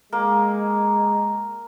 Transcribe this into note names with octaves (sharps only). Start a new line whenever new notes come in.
G#3 A#3